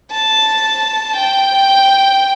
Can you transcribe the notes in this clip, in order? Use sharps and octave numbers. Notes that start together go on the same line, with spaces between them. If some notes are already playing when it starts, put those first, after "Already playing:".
A5
G5